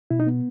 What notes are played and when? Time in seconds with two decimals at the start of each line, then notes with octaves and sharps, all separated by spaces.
0.10 B2 E4
0.20 D#4
0.27 B3